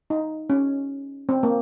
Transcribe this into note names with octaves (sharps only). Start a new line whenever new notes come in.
D#4
C#4
C4
A#3